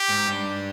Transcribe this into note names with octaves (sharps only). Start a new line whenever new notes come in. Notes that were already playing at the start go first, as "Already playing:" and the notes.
Already playing: G4
G#2
G2